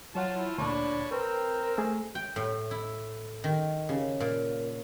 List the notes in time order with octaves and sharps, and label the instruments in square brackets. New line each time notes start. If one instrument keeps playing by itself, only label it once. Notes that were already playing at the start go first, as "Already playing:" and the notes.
[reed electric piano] F#3 C#5 F#5 [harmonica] F4 A5
[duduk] E4
[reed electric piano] D2 A#2 [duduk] D4 [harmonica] C#5 A5 B5
[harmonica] C4 G5 [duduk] A#4 [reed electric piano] B4
[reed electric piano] A3 G#4
[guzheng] G5
A2
E4
D#3
C#3
A#2